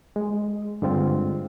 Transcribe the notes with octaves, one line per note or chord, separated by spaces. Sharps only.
G#3
G2 D3 G#3 C4 F4